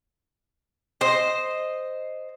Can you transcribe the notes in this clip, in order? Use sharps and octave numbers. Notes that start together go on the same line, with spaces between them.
C5 D#5